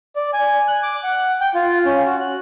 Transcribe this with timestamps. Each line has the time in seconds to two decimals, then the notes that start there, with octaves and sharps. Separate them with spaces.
0.16 D5
0.33 G#5
0.68 F#6
0.83 D6
1.04 F#5
1.41 G5
1.54 F4
1.85 C#4
2.06 F#4
2.21 F#6